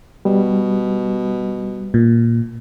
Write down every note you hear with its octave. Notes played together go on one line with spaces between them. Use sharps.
B2 G3
A#2